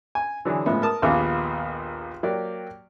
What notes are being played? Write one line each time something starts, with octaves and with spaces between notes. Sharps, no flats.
G#5
D3 E3 F#3 D4 G#4
A2 F3 G#3 B3 E5
A#4 A5 D#6
A#1 D#2 B3 F4 G#4 D6
F#3 A#3 G4 D5